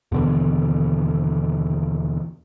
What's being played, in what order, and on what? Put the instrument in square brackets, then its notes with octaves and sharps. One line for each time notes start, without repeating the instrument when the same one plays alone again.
[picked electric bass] D#2 B2 D3 E3